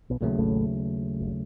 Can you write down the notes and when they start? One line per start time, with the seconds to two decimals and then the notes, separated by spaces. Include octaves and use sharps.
0.10 B1 B2
0.21 A#1 D#2 A#2 C#3 F#3 A3
0.38 A1 A2
1.20 G1